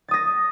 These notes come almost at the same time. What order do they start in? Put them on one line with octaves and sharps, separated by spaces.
A6 D#6 A#6